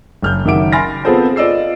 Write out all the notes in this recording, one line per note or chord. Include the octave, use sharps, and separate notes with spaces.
F#1 F6 G6
F#1 D#3 F#3 E5 D6 D7
G#5 B5 C6 F6 A6 A#6
B3 C4 F4 G#4 A4 C5
F4 D5 D#5 E6 C7